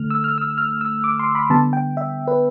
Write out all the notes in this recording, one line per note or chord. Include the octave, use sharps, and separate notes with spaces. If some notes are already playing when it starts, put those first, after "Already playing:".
Already playing: D3 A3 F6
E6
F6
E6
F6
E6
D6
C6
B5
D3 G3 B3 A5
G5
E5
B4